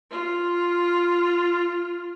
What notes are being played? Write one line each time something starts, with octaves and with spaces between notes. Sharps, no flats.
F4